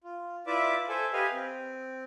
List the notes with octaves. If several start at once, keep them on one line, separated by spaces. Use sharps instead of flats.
F4
E4 F4 B4 D5 E5 D6
A4 C5 E5 G#5
G4 B4 D#5 F5 G#5
C4